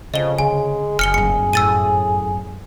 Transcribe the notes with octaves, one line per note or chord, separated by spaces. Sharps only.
F2 C#3 D#5 G7
D3 G#3 G#5
F#1 G#4 F6 C#7 G7
G1 F#2 C#7
A2 E6 A6 D#7